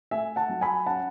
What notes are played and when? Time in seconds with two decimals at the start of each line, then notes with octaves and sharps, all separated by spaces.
0.11 A3 E5 G#5
0.36 F#5 A5
0.49 F#3
0.61 G#5 B5
0.86 C#4 F#5 A5